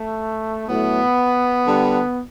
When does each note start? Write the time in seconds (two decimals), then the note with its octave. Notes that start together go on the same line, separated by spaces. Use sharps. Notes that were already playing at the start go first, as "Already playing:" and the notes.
Already playing: A3
0.68 A2 F#3 A3 B3
1.66 D3 G3